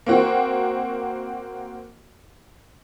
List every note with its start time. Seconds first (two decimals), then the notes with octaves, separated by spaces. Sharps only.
0.06 A#3 C4 F#4